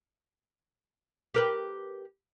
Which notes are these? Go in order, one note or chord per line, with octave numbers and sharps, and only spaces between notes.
G4 A#4 B4